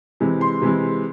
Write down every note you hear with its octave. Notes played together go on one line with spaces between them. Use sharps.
C3 E3 G#3
C6
C3 E3 G#3